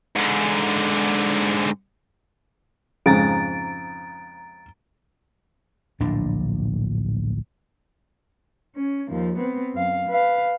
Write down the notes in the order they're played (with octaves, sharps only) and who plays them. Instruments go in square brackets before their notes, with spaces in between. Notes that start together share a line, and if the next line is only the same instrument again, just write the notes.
[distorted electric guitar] G#2 D3
[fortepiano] F2 G#2 C#3 [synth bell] A#5 A6 D7
[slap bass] D1 A#1 A2 D4
[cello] C#4
D#2 F3
B3 C4
F#2 F5
B4 F5